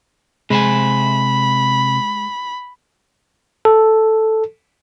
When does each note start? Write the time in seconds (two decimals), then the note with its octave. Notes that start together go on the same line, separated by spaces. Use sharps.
0.50 C3 G#3 C5 G#5 B5
3.65 A4